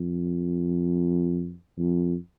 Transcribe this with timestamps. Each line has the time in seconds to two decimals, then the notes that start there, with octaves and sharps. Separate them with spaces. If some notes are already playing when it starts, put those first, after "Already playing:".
Already playing: F2
1.78 F2